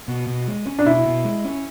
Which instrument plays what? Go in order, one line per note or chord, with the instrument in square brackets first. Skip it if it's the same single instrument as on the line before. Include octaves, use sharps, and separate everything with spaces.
[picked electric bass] B2
B2
G#3
C#4
[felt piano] D4
[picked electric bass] B2 [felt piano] E4
[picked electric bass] B2
G#3
C#4